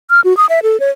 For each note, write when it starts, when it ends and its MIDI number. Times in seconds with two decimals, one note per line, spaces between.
0.10 0.20 89
0.24 0.36 66
0.37 0.46 87
0.49 0.60 76
0.63 0.79 69
0.80 0.90 73